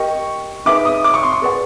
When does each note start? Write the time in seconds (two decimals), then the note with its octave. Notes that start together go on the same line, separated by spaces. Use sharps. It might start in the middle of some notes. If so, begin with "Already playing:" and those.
Already playing: G4 A#4 D#5 C#6
0.66 D#4 G#4 B4 E5 D6
0.85 D#6
1.04 D6
1.14 C#6
1.23 C6
1.32 C#6
1.42 G#4 B4 D5 F#5